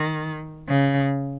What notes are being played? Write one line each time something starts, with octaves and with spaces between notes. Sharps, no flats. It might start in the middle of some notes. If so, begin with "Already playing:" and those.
Already playing: D#3
C#3